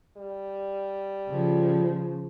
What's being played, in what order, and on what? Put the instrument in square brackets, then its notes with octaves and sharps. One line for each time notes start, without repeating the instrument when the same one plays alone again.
[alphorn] G3
[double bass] C#3 F3